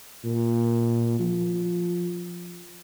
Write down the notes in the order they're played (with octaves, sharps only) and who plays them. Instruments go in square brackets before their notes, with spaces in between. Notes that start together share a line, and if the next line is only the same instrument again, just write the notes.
[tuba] A#2
F3